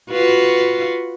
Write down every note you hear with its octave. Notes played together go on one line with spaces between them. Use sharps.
F4 F#4 B4